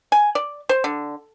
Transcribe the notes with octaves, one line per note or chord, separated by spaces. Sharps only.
G#5
D5
C5
D3